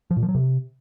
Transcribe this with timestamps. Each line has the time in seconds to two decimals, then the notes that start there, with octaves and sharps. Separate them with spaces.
0.11 F3
0.17 A#2
0.23 F3
0.29 F#3
0.35 C3